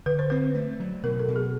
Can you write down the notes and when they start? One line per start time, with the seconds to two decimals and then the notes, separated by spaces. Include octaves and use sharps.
0.06 D3 B4
0.19 C5
0.30 C4 B4
0.55 A3
0.80 F#3
1.03 B2 A#4
1.19 A4
1.28 B2
1.36 G#4